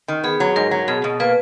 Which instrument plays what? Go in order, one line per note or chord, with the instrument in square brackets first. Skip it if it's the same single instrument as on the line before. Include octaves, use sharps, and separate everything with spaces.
[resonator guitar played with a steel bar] D#3
[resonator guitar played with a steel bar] B3 [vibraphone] G#4
[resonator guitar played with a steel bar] F#3
[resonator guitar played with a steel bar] G#2 [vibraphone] A#4
[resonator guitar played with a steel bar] F#3
[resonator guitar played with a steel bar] B2 [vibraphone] G#4
[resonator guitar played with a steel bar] B2
[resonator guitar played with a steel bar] A#3 [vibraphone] B4